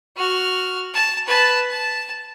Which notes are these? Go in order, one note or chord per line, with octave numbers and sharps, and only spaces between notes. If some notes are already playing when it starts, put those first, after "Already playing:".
F#4 F6
A5
B4 A5
A5